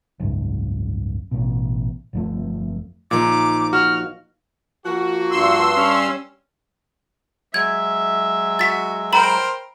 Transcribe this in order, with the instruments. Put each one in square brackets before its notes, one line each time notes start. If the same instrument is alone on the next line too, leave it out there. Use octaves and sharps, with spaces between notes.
[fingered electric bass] F#1 C#2 G#2
A1 B2
G1 F2 A3
[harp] A#1 A#3 D#4 [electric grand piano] A#2 [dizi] D6
[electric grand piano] F#4 [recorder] F6
[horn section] F3 A#3 F#4
[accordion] G2 C6 E6
[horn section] G3 C#4
[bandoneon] F#3 G#3 [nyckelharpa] E5 [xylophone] G#6
[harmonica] F#4 [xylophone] A6 B6
[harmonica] A#4 C5 G5 [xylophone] A#5 B5 F#7